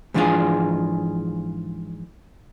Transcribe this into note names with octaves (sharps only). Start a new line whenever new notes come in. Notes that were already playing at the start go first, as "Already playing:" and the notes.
G#2 E3 F3 D4 F4 G#4